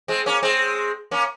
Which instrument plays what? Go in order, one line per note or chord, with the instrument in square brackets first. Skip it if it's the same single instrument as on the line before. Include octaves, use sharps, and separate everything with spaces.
[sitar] G#3 C4
A#3 C#4
G#3 C4
A#3 C#4